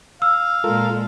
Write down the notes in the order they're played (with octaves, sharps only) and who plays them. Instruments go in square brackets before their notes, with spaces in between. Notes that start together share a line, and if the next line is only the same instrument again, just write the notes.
[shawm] F5 [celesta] E6
[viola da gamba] A#2 G#3 [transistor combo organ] F4 A4 A#4